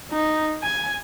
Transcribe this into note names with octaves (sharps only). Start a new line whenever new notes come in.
D#4
G#5